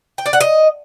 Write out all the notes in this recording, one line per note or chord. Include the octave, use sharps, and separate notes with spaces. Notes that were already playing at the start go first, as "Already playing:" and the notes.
G5
D5
F#5
D#5